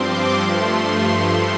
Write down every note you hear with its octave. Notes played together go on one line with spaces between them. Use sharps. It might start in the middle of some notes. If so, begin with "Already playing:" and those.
Already playing: G2 F3 C4 C6 D6
G2 F3 A3 C6